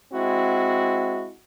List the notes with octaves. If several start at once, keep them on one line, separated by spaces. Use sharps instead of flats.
G#3 C4 E4 F#4